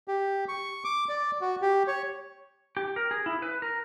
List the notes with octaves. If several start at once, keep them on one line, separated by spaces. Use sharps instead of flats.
G4
C#6
D6
D5
F#4
G4
C#5
G4
A#4
G#4
E4
B4
A#4